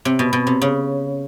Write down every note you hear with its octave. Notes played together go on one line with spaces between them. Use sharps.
C3
B2
B2
C3
C#3